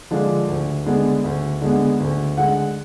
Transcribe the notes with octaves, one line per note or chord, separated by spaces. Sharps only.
D3 F3 G#3 D4
D2
D3 G#3 B3
D2
D3 G#3 B3
D2
D3 G#3 F#5